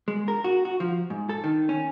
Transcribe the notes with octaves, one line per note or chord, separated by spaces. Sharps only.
G#3
A#4
F#4
F#4
F3
G#2
A4
D#3
C#4